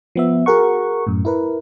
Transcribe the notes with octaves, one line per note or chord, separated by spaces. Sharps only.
F3 B3 E5
F#4 G#4 A#4 F#5 C#6
F#2 A2
E4 A#4 B4